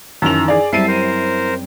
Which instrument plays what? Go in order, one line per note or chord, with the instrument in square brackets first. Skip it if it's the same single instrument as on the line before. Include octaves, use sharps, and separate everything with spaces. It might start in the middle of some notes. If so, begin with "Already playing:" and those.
[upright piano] F#2 F7 [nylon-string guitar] D#3 E3 A5
[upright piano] G#4 D5
[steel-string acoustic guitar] F#2 G3 C4 [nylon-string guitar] E4 [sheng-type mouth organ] E5 A5 [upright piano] C7 D#7
[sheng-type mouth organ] A#4 C5